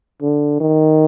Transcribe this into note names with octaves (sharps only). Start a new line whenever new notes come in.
D3
D#3